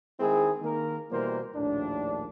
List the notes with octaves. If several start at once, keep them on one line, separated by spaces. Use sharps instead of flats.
D#3 G#3 C4 E4 G#4
D#3 A#3 A#4
B2 E3 G3 A#3 A#4 C5
A#1 D#2 A2 D4